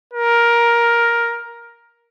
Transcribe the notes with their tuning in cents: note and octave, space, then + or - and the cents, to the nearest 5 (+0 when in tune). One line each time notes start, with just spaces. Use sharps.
A#4 +10